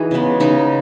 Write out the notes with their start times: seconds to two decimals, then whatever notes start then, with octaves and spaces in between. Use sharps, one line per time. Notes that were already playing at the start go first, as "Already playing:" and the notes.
Already playing: E3 D#4 F#4 G#4
0.11 C#3 G#3 B3
0.40 C#3 G#3 B3 D#4